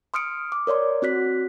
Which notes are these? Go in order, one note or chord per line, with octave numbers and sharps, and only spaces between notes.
C6 D#6 F6 C#7 D7
D6
A#4 C#5 D5 C6
C4 F#4 F#6 B6